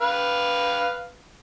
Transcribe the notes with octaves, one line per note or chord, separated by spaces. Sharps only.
B4 F5